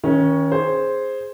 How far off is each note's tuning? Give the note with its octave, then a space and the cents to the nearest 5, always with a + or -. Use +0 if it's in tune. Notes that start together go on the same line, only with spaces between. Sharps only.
D#3 +35 C#4 +0
G#4 +0 C5 +0